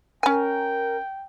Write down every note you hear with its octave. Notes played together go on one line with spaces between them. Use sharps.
C#4 A#4 G5 G#5